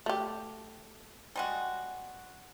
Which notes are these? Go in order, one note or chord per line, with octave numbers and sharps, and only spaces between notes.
A3 G4
G3 G#3 F#4